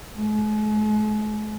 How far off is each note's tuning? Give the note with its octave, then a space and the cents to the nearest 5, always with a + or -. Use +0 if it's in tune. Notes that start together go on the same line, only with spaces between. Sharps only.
G#3 +45